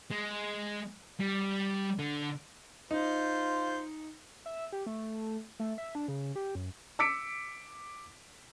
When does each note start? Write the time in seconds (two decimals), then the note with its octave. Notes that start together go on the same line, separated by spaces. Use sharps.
0.11 G#3
1.20 G3
1.99 D3
2.91 D#4 F4 C5
4.46 E5
4.72 G4
4.86 A3
5.60 A3
5.78 E5
5.95 D4
6.08 C#3
6.36 G4
6.55 F#2
6.99 D6 E6 B6 C#7 D7